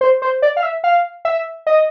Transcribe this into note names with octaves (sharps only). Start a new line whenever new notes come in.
C5
C5
D5
F5
E5
F5
E5
D#5